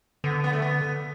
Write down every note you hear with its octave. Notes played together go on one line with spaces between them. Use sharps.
D3 B3
B3
A3
B3